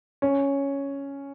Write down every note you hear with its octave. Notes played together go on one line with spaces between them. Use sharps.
C#4